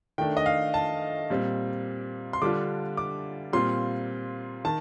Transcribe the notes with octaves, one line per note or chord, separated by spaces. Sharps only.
D#3 A3 D4 G5
D#5
F5
A5
A#2 G3 C4
C6
D3 G3 D4 F4 D6
D6
A#2 G3 C4 F4 C6
D#3 A5